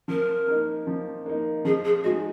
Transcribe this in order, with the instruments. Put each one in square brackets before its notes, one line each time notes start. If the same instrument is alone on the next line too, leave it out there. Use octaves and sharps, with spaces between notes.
[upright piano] F3 [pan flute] A#4
[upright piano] A#3 D#4
F3
A#3 D#4
[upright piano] F3 [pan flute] G#4
[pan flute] G#4
[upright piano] G#3 D#4 G#4 D#5 [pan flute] F#4